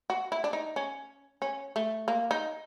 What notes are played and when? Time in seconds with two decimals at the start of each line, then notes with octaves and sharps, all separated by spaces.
0.10 F#4
0.32 E4
0.44 D4
0.53 D#4
0.76 C#4
1.42 C#4
1.76 A3
2.08 A#3
2.31 D#4